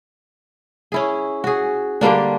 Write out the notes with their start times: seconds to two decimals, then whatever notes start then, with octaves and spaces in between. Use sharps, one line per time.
0.92 C#4 E4 G#4
1.44 F#4 G#4
2.01 D3 G3 A#3 D4